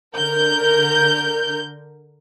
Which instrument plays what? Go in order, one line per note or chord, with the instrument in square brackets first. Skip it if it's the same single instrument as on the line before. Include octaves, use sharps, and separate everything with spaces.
[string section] D3 A#4 G6